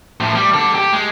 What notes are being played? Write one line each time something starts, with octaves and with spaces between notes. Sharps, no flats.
A2 F3
G3
D4 A4
G4
G#3